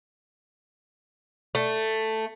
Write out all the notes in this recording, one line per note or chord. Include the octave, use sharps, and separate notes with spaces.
A3